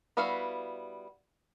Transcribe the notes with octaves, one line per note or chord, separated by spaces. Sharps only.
G3 B3 E4 F#4 F5